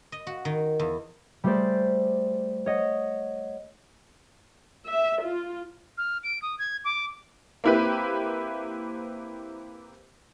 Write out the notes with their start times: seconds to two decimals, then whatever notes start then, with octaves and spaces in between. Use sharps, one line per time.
0.12 D#5
0.27 F#4
0.45 D#3
0.79 E2
1.44 G3 A3 G4 G#4 C5 D5
2.66 C#5 D#5 F#5
4.86 E5
5.23 F4
5.98 F6
6.23 D7
6.42 D#6
6.59 G#6
6.84 D6
7.64 A#3 C4 E4 G4 B4